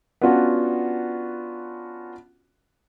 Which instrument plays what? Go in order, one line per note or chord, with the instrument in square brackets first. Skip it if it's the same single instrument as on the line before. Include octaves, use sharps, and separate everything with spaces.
[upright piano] B3 C#4 D4 F4 F#4 A5